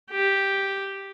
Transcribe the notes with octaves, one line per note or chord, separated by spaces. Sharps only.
G4